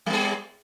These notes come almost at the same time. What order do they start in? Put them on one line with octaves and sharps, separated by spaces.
G3 B3 G#4